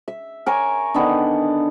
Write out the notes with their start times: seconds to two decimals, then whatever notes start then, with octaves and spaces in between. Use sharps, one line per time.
0.08 E5
0.46 A#4 C#5 G#5 D6
0.94 D3 D#3 B3 D4